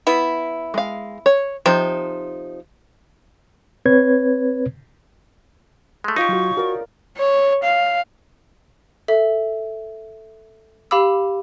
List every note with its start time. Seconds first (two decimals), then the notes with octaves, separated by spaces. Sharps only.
0.07 B3 E4
0.74 G#3 F5
1.26 C#5
1.66 C3 F3 D#4 C5
3.86 C4 B4 C#5 G#6
6.04 G#3 A3
6.16 D#4 F4 G4 C#5 C#6
6.29 F#3 F#4
6.57 F#4 A#4 D5
7.18 C#5
7.63 F5
9.08 A4 E5
10.91 G4 F5 B5 D6 E6